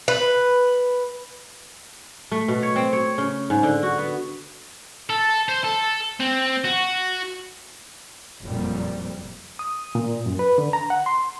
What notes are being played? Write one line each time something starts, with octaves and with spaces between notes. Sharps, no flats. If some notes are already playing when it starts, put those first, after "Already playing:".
B4
A3
B2
C#5
C4
C#5
C#3
G#2
D3
F#4
B3
A4
C5
A4
C4
F#4
F#1 F2 A#2 G3
D#6
A#2
F#2
B4
D3
A#5
F#5
C6